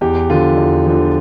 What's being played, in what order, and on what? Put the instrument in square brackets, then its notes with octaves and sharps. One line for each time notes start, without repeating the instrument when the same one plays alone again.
[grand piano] E2 G4
D3 F3 F4
E2
D3 F3